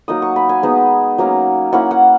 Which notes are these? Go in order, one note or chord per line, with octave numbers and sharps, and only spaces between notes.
F#3 A#3 D#4 D#6
C#6
B5
G#5
G#3 B3 D#4
F#3 A#3 C#4
A#3 C#4 E4 F#5
F#5